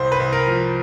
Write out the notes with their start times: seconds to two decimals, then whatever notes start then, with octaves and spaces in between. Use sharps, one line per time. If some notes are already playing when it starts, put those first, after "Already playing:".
Already playing: C2 C5
0.12 B4
0.20 C2
0.33 A#4
0.47 F3